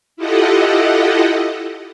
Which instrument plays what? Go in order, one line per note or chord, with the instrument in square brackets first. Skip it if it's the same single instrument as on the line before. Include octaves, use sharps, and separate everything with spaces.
[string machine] E4 F4 G4 A4 D#5 F#5